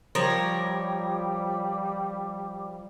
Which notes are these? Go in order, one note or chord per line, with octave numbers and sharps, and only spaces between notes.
F3 G3 A#4 C#5